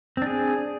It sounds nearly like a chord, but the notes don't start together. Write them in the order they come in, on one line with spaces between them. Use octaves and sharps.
C4 D4 G#4